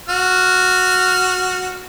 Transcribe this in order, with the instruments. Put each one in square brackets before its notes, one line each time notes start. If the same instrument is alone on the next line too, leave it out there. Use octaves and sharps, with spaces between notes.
[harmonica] F#4 F6